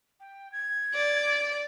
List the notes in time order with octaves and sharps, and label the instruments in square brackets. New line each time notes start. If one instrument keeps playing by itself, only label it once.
[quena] G5
G#6
[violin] D5